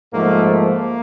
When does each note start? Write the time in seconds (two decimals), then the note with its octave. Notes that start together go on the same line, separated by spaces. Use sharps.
0.12 G#2 F3 A3 A#3
0.47 A#3